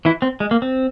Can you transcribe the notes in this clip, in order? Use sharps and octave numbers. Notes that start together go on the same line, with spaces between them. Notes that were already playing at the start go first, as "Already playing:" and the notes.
E3 E4
C4
G#3
A#3
C4